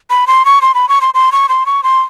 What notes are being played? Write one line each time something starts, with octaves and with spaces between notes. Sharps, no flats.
B5
C6
C#6
C6
B5
C#6
C6
C6
C#6
C6
C#6
C6